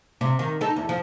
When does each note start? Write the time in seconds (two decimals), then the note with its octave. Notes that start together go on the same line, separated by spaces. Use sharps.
0.21 C3
0.39 D#3
0.61 D#4 A4
0.76 E2
0.89 F3